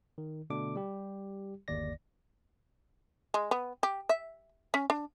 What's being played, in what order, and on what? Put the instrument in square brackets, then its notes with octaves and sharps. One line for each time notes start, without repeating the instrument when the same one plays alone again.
[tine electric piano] D#3
B2 D3 A3 D4 D6
G3 G4
G1 D#2 D5 A#6
[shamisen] G#3
B3
G4
E5
C#4
D4